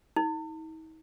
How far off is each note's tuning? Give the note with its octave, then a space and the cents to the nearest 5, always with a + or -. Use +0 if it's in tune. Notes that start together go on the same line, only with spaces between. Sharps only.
D#4 +45